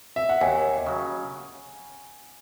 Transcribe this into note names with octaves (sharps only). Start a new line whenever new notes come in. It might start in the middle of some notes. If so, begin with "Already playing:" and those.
E5
F#5
D#2 G#5
C#3 F#3